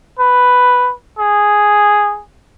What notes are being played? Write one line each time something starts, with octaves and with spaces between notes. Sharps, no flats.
B4
G#4